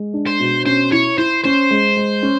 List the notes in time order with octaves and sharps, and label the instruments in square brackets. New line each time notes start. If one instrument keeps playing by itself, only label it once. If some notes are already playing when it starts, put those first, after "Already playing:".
Already playing: [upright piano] G#3
D4
[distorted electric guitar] C5
[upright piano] B2
[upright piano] C#4 [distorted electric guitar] C5
[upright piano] E4 [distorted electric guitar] C#5
[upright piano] E4 [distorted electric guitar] C5
[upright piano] C#4 [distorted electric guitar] C5
[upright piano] G#3
G#3
C#4